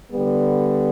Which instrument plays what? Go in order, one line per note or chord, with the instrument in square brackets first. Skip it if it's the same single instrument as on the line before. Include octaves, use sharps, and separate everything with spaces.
[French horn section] D3 G3 B3